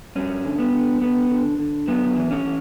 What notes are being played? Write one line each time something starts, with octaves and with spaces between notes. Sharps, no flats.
G2 C#4
D3
B3
D3
D3 B3
D3
D3
F#2 B3
E3
C#4
E3